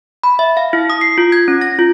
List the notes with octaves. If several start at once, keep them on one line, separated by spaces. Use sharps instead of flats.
B5
E5
F5
E4
D#6
C7
F4
G#6
C#4
A#6
F4